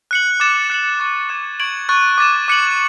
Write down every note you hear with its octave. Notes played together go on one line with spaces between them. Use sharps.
F#6 C#7 F#7
D6 A6 E7
F#6 C#7 F#7
C#6 F#6 A6 E7
D6 G#6 C#7 E7
C#6 G#6 D7 F#7
C#6 F#6 A6
D6 A6 E7
D6 F#6 C#7 F#7